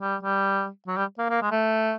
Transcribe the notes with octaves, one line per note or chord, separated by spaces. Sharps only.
G3
G3
F#3
G3
A#3
A#3
G#3
A3